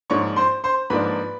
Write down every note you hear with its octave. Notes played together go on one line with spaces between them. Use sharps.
G#2 F3 A#3 D4 C#5 C#6
C5 C6
C5 C6
G#2 F3 A#3 D4 B4 B5